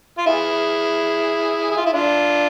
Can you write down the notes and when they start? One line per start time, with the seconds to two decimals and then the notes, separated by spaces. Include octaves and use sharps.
0.18 F4
0.26 E4 G#4
1.71 G#4
1.78 F4
1.86 E4
1.93 D4 F4